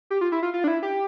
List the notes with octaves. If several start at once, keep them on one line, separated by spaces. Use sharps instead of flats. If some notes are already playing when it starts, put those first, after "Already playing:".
G4
F4
E4
F4
F4
D4
E4
G4